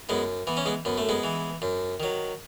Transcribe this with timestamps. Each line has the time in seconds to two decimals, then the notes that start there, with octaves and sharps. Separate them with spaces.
0.09 F#2 G#3 B3
0.47 E3 B3
0.57 C#4
0.66 G#3 B3
0.85 F#2 B3
0.98 A3
1.09 G#3 B3
1.24 E3
1.62 F#2
2.00 D#3 F#3